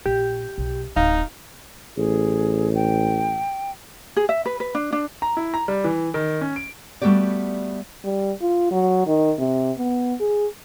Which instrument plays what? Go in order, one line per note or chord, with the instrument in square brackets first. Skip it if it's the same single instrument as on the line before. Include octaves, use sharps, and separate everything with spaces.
[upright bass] A#1 [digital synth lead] G4
[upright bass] B1
[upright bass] D1 A1 [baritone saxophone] D#4 [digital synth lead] F5
[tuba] A1 [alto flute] G#4
[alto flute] G5
[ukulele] G#4
E5
B4
B4
D4
D4
[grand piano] A#5
E4
A#5
G3
E3
D#3
C#4
D7
[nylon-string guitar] G3 A3 B3 F#4 G4 D5
[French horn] G3
F4
F#3
D#3
C3
B3
G#4